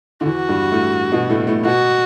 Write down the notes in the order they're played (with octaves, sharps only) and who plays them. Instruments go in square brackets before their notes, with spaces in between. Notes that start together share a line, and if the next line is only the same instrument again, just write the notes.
[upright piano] D3
[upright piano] E2 E3 [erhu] F#4
[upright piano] G2 G3
A2 A3
B2 B3
A2 A3
A2 A3
[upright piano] B2 B3 [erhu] F#4